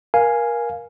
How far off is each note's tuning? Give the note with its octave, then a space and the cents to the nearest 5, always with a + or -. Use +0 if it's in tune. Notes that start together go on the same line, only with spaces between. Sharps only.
A#4 +25 F5 +0 G#5 +0